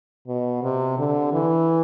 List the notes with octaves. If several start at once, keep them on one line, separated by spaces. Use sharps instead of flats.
B2
C3
D3
E3